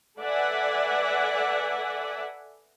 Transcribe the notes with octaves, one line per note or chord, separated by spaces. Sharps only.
A4 B4 D5 E5 F#5 G#5